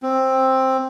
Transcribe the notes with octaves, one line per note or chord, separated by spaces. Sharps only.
C4